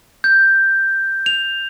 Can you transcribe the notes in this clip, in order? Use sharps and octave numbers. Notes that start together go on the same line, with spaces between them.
G6
F7